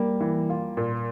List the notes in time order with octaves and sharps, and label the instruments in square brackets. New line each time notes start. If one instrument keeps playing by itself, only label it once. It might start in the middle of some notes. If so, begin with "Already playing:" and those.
Already playing: [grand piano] G3 A#3
[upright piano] E3
F4
A#2